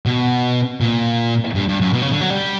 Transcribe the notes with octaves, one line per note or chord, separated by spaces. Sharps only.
B2
A#2
G2
G2
F#2
B2
C#3
D3
F#3
G3